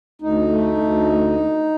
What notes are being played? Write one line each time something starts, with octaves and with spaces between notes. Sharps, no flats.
D2 D#4
A3
D2